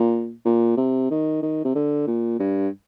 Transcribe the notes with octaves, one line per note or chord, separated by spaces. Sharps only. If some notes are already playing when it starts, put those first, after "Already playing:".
Already playing: A#2
A#2
C3
D#3
D#3
C3
D3
A#2
G2